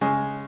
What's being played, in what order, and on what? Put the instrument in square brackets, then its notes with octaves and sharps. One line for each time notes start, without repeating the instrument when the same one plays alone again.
[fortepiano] C#3 G#3